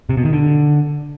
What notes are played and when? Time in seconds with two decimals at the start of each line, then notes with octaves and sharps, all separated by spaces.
0.09 C3
0.17 B2
0.25 D#3
0.33 D3